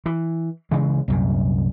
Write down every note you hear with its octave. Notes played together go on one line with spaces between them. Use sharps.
E3
C#3 E3 G#3
C2 F#2 A#2